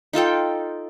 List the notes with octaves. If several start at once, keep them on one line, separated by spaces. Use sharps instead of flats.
D#4 F4 A4 G5